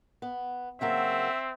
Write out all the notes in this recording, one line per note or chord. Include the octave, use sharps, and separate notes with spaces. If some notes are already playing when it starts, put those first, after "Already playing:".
B3
C#3 F#3 A#3 C4 E5